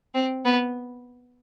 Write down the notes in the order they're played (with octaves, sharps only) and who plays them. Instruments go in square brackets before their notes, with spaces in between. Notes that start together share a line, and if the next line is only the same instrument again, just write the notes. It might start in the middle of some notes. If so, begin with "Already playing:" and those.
[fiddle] C4
B3